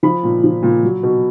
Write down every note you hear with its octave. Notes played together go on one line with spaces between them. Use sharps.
F3 B5
A#2
F3
A#2
F#3
B2